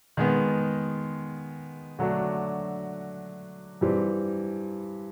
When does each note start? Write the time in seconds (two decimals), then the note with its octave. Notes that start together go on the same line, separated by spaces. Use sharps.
0.17 D#3 G#3 B3
1.99 D3 F#3 A3 D4 F#4
3.81 G2 E3 G3 C4